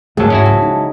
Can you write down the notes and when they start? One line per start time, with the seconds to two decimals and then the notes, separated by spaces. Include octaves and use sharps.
0.17 G#1 C#2 F#3 A3 C4 G#4 A4
0.30 G#2 C#4 E4 F#4
0.46 F3
0.62 D#4